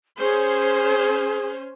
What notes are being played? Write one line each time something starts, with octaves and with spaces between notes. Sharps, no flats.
C#4 G#4 C5